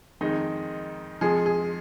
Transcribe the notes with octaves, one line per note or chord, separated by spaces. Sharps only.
F2 D#3 G#3 D#4
F2 F3 G#3 G#4
G#4